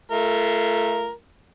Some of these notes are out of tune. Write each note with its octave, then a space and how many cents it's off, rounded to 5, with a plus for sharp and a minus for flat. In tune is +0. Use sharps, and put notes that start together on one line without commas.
A3 -15 F4 -35 A#4 +0